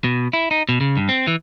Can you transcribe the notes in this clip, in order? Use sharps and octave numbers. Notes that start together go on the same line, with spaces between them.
B2
E4
D#4
B2
C#3
G2
C4
E3